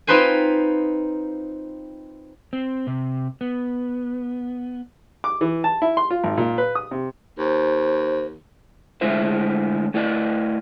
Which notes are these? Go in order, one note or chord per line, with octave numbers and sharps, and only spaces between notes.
C4 D#4 F4 B4 C5 G#5
C4
C3
B3
D6
E3
A5
E4
C6
F4
G#1
A#2
B4
D#6
C3
D#2 C5
D3 G#3 A3 E4 C5 E5
A3 E4 B4 D5 D#5